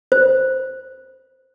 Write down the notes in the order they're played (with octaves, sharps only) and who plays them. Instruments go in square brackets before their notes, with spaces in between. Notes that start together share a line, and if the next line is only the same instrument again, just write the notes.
[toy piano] C5